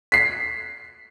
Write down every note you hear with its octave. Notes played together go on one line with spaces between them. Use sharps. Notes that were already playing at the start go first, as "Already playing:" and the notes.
B6 C7